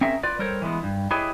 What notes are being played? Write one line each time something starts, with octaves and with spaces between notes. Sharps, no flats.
C4 C#4 G#4 A#4 E5
F4 B4 D5
G3 A4 A#4 C5 C#5
E3 G#3 B3
G2
E4 G4 G#4 B4 C#5 D#5